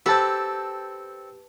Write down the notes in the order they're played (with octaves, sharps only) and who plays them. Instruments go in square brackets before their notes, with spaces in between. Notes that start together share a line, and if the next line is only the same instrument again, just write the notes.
[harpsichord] C4 A4 [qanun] G4 [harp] B4 A5